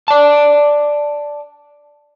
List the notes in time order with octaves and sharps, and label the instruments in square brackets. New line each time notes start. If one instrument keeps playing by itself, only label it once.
[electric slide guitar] D5 A5